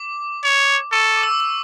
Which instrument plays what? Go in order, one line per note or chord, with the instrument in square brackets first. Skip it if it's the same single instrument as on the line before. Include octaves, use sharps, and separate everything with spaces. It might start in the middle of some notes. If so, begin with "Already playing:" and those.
Already playing: [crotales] D6
[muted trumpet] C#5
[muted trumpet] A4 [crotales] C#6
[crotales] D6
E6
D6
E6